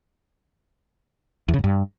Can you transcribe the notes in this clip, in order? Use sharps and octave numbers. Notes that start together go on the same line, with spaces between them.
E2
C#3
G#2
G2